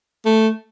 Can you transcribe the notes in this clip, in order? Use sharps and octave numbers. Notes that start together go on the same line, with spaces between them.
A3